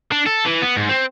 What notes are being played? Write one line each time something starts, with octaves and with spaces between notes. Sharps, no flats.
D4
A4
E3
B3
G#2
C4